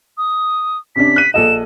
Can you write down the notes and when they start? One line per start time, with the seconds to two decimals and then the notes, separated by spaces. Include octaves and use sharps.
0.18 D#6
0.96 C3 C#4 D4 B6
1.16 F#6 D#7
1.34 A#1 A4 D#5 E7